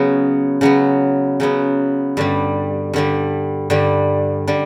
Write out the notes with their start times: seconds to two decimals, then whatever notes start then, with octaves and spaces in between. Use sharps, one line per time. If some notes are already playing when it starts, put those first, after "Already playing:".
Already playing: C#3 F#3 B3
0.61 C#3 F#3 B3
1.40 C#3 F#3 B3
2.17 G2 D3 G3
2.93 G2 D3 G3
3.70 G2 D3 G3
4.47 D3 G3